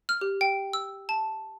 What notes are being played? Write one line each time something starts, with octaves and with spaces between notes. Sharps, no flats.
F6
G4
G5
E6
A5